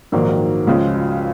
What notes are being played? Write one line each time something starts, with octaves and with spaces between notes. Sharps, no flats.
A#1 G#2 D#3 F#3 A#3
C#2 C#3 F3 G#3